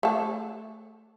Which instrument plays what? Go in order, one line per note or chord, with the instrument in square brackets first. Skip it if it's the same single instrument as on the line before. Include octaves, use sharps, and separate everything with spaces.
[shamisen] A3 A4